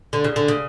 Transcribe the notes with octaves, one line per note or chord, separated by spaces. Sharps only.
D3
C#3
D3
C#3